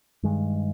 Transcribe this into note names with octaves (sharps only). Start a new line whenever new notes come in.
G2 D#3 G#3